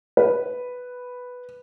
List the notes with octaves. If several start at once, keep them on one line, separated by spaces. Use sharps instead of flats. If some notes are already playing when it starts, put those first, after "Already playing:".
B4